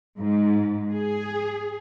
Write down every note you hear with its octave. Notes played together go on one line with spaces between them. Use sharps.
G#2
G#4